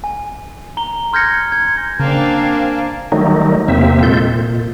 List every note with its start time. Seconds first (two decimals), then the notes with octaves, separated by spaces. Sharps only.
0.04 G#5
0.77 A#5 G7
1.13 C6 F6 G6 G#6 A#6 C#7
1.52 G#6
1.99 C#3 A#3 C4 D4 A#4 F5 G#5 A5
3.12 D#3 F#3 G3 A3 D#4
3.68 E2 C3 A#3 C4 E5
4.03 A#2 G#3 F4 A4 G6
4.20 A#2